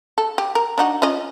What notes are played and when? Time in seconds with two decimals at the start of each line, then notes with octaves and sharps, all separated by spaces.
0.18 A4
0.38 G4
0.55 A#4
0.78 D4 D#4 F#4
1.02 C#4 F4 D#5